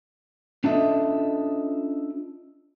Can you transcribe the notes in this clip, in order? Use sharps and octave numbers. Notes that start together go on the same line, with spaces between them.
C#4 D4 F4 A4 D#5 E5